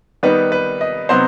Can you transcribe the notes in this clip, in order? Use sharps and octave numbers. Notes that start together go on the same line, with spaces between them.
D#3 G3 B3 D#4 B4
B4
D#5
C3 F#3 B3 D#4 C5